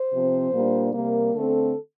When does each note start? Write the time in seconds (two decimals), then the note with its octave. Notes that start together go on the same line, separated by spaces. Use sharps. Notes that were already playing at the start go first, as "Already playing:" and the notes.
Already playing: C5
0.13 C3 F3 C4
0.53 A#2 G3 A#3 D4
0.93 C3 G3 A#3 A#4
1.33 D3 A3 C4 A4